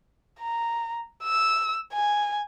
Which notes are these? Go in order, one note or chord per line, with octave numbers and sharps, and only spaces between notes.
A#5
E6
G#5